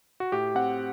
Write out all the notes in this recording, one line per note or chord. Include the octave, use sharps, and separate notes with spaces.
F#4
A2 G4
C4 F#5